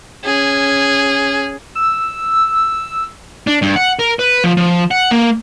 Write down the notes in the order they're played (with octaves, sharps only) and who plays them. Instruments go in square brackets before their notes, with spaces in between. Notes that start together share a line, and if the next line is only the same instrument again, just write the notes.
[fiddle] C#4 G#4
[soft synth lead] E6
[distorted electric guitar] D4
G2
F#5
A#4
B4
F3
F3
F#5
A#3